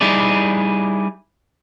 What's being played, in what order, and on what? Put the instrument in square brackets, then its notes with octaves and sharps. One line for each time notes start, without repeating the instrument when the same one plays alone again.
[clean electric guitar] G3 D#4 E4 G#4 D5